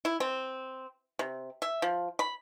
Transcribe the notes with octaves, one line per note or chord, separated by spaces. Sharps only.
E4
C4
C3
E5
F3
B5